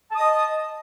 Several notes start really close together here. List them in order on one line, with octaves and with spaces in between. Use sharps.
A5 D#6 D#5